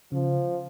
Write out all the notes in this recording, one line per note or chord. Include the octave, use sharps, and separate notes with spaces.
C#3 F3